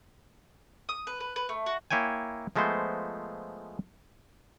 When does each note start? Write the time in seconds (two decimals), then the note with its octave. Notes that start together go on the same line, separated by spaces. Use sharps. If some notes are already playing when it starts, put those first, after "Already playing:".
0.89 D#6
1.07 B4
1.20 B4
1.36 B4
1.49 A3
1.66 F#4
1.91 A#3 E4 C#5 G5 G#5
2.56 F3 G#3 A3 B3 C5